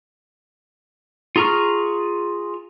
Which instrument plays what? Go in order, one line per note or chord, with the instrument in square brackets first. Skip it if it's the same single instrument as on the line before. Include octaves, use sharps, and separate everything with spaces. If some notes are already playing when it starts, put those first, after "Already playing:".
[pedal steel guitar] F4 G#4 A#5 C#6 F6